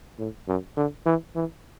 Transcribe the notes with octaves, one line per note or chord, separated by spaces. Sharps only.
A2
F#2
D3
E3
E3